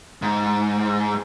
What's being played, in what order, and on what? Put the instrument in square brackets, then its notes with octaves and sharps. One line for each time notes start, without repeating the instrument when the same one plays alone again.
[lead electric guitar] G#2